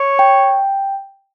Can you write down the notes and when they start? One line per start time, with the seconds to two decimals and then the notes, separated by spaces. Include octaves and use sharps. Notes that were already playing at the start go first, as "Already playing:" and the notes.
Already playing: C#5
0.19 G5